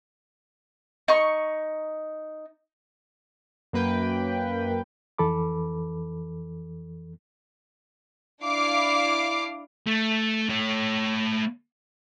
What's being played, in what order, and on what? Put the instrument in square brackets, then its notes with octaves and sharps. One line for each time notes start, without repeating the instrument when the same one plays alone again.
[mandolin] D#4 C#6
[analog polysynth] F#2 A#3 B4 G5
[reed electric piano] F2 E3 A4 B5 D6
[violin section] D4 E4 F5 D6 C7
[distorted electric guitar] A3
A3 C#5